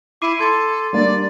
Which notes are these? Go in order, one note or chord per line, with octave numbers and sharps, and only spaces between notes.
E4 D6 C7 D#7
A4 C6 G#6
G3 A#3 D4 D5